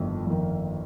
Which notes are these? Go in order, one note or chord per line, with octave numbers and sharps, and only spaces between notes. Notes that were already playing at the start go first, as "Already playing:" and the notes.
Already playing: G1 F2 D#3
F2 D#3